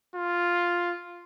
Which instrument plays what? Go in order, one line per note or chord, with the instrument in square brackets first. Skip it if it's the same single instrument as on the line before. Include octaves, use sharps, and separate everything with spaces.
[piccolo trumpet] F4